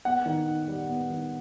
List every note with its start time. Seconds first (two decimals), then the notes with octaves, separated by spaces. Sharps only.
0.05 B3 F#5
0.26 D#3
0.47 D#4
0.68 G3
0.89 B3
1.10 D#3